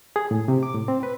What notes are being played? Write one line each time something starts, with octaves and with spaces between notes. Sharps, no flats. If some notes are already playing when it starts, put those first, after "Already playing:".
G#4
A2
C3
D6
A2
C4
B4